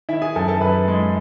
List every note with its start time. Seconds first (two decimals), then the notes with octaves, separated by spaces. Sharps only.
0.09 D#3 E4 E5
0.22 G#4 G#5
0.35 F#2 A4 A5
0.48 A4 A5
0.61 F#2 B4 B5
0.88 G#3